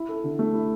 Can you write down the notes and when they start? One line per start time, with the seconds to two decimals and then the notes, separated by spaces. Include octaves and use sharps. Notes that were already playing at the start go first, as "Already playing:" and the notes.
Already playing: E4
0.09 A4
0.24 D3
0.39 A3
0.53 E4